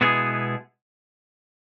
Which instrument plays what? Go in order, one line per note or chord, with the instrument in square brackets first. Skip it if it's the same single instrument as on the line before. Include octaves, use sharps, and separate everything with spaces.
[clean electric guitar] B2 G#3 B3 E4 G#4